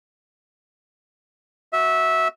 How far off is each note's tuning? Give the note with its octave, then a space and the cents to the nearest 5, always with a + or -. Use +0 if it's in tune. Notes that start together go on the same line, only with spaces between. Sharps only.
F#4 +0 E5 -15